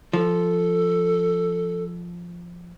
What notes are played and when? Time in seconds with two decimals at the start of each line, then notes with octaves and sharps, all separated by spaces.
0.13 F3 A4